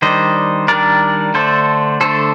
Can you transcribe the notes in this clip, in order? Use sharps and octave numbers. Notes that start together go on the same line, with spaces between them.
D#3 G3 D4 C5 D#5
D#3 G3 D4 A#4 D5
D3 A3 D4 A4 C5
D3 A3 D4 A4 C5